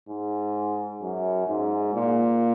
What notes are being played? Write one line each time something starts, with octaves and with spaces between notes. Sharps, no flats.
G#2
F#2
G#2
A#2